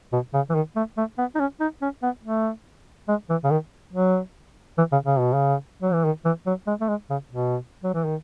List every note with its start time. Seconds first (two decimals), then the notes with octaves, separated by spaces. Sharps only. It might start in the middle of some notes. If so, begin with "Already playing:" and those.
0.13 B2
0.34 C#3
0.50 E3
0.55 D#3
0.76 A3
0.97 A3
1.18 B3
1.35 D#4
1.39 C#4
1.61 D#4
1.82 C#4
2.03 B3
2.24 A3
3.08 G#3
3.30 E3
3.44 C#3
3.51 D#3
3.93 F#3
4.78 E3
4.92 C#3
5.06 C#3
5.20 B2
5.33 C#3
5.82 F#3
5.93 E3
6.05 D#3
6.25 E3
6.47 F#3
6.67 G#3
6.81 A3
6.89 G#3
7.10 C#3
7.31 B2
7.84 F#3
7.94 E3
8.05 D#3